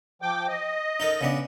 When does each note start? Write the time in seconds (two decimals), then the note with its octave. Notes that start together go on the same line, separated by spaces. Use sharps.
0.22 F3 G5 D6
0.48 D#5
1.00 D#4 A4 A#4
1.21 C#3 B3 D4